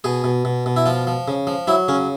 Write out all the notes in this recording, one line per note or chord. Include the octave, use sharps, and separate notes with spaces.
B2 G#4
B2
B2
B2
E4
F3 F4
F3
C#3
F3
F#3 E4
C#3 C#4